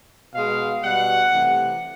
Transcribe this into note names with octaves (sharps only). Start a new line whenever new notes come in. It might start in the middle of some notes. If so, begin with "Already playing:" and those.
B2 G#3 F5
B2 G3 F#5
C3 E3 A3